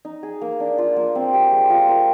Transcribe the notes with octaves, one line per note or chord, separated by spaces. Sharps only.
D#4
G#4
A#3
D4
F4
A#3
C4
G4
G#3
F4
A#4